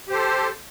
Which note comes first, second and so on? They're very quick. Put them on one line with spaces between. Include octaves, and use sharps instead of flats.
G4 C5 A4